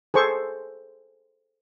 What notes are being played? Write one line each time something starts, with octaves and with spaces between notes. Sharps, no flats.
G#4 A4 C5 C#6